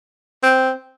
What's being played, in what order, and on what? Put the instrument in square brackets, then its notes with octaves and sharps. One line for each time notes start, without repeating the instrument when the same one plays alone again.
[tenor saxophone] C4